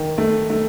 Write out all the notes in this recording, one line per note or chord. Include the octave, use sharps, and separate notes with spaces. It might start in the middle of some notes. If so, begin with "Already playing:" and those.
Already playing: D#3
A3
A3